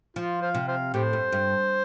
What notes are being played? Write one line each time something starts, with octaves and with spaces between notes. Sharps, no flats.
F3 F4
C5 F5
C3
C5 F5
A2 G4 C5
G2
G2